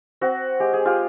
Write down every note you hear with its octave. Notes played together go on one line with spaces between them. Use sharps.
C4 F#4
G#3 G4
G#4
F4 G4